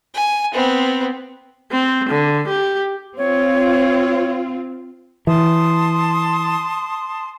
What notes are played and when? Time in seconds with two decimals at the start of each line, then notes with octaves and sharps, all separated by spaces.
0.15 G#5
0.53 B3 C4
1.72 C4
2.09 D3
2.47 G4
3.17 C4 F4 C#5
5.27 E3 A5 C6 D#6